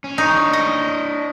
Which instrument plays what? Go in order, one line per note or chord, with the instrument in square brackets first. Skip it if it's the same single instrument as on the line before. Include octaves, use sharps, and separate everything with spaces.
[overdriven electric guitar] C#4
[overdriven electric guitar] D4 C#5 [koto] D#4
[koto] D#5